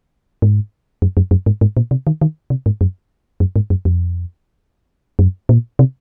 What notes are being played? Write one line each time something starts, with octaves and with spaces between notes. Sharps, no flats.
G#2
F#2
F#2
F#2
G#2
G#2
A#2
C3
D#3
D#3
C3
G#2
F#2
F#2
G#2
F#2
F2
F#2
A#2
C3